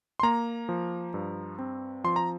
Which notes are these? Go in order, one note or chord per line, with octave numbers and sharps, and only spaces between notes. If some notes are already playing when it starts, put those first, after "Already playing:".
C6
A#3 A#5
F3
G2
C4
F3 C6
A#5